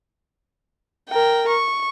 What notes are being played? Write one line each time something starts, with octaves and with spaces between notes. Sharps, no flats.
A#4 G5
C#6